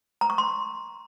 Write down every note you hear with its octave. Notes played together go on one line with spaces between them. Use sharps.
A#5
C#6
C6